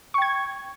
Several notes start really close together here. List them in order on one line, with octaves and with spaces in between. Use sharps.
C#6 G5 G#6